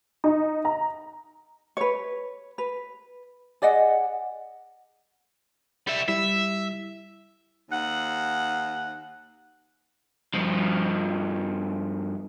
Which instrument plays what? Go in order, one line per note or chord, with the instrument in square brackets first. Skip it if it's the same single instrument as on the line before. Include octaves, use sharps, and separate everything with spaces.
[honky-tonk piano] D#4
A#5
[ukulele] B4 C#5
B4
G#4 D5 D#5 F#5
[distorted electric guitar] G3 E5
[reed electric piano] G3 E4 [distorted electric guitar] E5
[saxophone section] D#2 F#5
[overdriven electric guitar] G2 F3